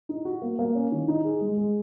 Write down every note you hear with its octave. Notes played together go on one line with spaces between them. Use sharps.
D#4
F#4
A#3
A#3
C#4
D#3
D#4
G#4
G#3
G#3